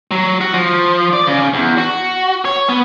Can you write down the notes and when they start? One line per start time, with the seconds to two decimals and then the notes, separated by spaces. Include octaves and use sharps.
0.11 F#3
0.41 F#4
0.54 F3
1.13 D5
1.27 C#3
1.54 E2
1.78 F#4
2.45 C#5
2.68 B3